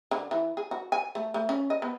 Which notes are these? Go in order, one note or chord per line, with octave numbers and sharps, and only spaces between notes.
D3
E3
G#4
F#4
G#5
A3
A3
C#4
D#5
B3